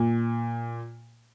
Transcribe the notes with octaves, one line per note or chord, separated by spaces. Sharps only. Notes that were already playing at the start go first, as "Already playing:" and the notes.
Already playing: A#2